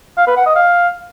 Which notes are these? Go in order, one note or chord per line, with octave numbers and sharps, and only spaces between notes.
F5
B4
F#5
D#5
F5